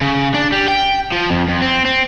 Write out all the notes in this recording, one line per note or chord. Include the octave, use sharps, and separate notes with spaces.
C#3
D4
G3
G5
F3
F2
F2
C4
C4